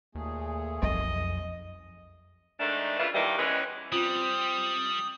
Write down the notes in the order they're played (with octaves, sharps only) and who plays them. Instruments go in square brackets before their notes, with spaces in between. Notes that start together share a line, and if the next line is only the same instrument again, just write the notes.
[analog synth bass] D#2 [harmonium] A#2 A3 G#4
[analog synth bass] B1 [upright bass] F2 [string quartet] D#5
[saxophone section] G#2 D#3 A3 D4
C#3 E3 E4 F4
D#2 D#3 E3 G3 G4
E3 G#3 B3 C#4
[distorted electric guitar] G3 [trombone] C4 [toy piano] C#4 F4 [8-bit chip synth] D#6